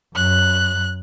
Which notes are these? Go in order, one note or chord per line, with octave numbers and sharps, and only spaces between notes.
F#2 F#6